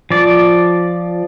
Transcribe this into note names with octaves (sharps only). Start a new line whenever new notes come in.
F3 D5